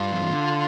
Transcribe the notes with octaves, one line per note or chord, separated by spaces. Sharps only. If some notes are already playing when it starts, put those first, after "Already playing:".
Already playing: G2 F4
F3
E3
D3